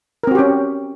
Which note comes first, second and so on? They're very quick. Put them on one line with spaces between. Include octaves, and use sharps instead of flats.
A#4 C4 F#4 G4 C#4